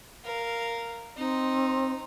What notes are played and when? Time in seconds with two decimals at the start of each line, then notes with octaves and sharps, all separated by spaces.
0.25 A#4 F5
1.17 C4 D#4